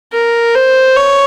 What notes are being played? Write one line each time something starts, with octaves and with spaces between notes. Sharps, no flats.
A#4
C5
C#5